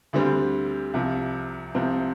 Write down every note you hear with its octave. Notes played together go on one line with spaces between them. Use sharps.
D2 D3 G3 C4
C2 C3 F3
C2 C3 F3 C4